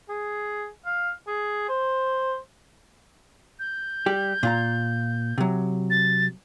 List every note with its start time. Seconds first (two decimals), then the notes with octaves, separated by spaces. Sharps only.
0.09 G#4
0.85 F5
1.27 G#4
1.68 C5
3.59 G6
4.06 G3 G4
4.43 A#2 F4 A#5
5.38 C3 F#3
5.90 A6